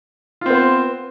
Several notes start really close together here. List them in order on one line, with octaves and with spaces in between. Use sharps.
F4 C4 B3 C5